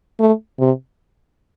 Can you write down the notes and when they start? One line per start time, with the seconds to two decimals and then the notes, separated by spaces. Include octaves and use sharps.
0.20 A3
0.59 C3